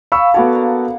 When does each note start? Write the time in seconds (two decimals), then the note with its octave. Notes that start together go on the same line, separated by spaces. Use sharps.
0.12 F5 B5 C#6 E6
0.34 B3 F#4 A4 C#5 D5 F#5
0.53 A#3 D4